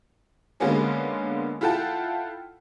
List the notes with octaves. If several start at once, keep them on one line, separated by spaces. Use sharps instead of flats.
D3 G#3 A#3 B3 C#4 G#4
E4 F4 A4 F#5 G5 A5